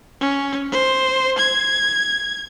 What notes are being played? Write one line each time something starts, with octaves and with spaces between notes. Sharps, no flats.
C#4
C5
G#6